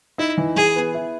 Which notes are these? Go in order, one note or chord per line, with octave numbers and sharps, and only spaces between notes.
D#4 E4
E3
E3 G#4
B3
E4